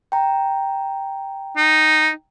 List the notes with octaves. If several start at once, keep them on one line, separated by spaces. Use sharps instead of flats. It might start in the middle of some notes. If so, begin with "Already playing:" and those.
G5 A#5
D#4